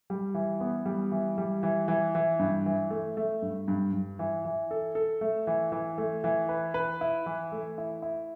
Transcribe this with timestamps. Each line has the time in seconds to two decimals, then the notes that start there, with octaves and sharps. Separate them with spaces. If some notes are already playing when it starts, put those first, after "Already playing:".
0.10 G3
0.34 E3
0.60 B3
0.86 G3
1.12 E3
1.38 G3
1.63 E3
1.88 E3
2.15 E3
2.39 G2
2.66 E3
2.90 A3
3.17 A3
3.42 G2
3.68 G2
3.93 G2
4.19 E3
4.45 E3
4.71 A4
4.95 A4
5.21 A3
5.47 E3
5.72 E3
5.98 A3
6.24 E3
6.49 B4
6.74 B4
7.01 E4
7.26 E3
7.52 A3
7.78 E4
8.02 E4